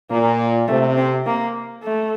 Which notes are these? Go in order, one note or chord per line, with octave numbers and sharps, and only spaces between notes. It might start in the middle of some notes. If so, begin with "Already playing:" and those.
A#2 A#3
C3 A3
C4
A#3
A3